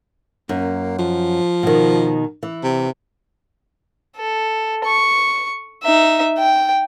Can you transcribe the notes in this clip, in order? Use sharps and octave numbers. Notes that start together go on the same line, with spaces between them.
F#2 A#3
F3
B2 D#3
E3
C3
A4
C#6
D#4 E5
G5